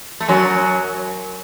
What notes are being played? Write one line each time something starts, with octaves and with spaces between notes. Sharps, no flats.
A3
F#2 F#3